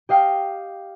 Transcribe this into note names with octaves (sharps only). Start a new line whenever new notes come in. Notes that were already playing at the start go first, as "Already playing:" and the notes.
G4 D#5 F5 G5 F6